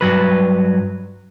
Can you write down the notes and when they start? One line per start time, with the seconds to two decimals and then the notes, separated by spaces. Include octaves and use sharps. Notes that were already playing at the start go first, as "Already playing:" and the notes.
0.01 G2 F#3 B4